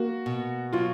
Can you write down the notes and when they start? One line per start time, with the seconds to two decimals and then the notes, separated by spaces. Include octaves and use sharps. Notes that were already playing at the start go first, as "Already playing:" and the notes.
Already playing: A#3 F#4
0.26 B2
0.73 F#3 F4